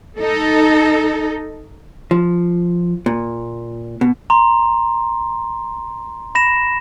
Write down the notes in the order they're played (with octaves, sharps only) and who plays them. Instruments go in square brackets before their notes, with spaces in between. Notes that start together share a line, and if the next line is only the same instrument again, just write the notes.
[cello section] D#4 A4
[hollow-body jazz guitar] F3
A#2
B2
[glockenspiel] A#5 C6
B5 A#6 E7